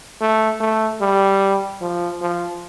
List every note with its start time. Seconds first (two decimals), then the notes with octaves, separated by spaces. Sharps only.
0.21 A3
0.60 A3
1.01 G3
1.81 F3
2.21 F3